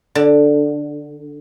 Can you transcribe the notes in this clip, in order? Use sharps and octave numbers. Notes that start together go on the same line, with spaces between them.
D3